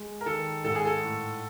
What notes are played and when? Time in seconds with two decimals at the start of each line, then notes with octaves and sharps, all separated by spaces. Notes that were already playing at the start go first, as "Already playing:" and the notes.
Already playing: G#3
0.21 A#4
0.26 D#3 A4
0.64 G#2 A4
0.75 G#4
0.85 A4
1.03 A2